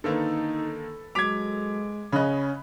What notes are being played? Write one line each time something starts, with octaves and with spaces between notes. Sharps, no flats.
D3 D#3 A#3 D#4 A4 B4
F#3 G#3 D6 G#6 B6 F7
C#3 C#4 D#5 B5 F#6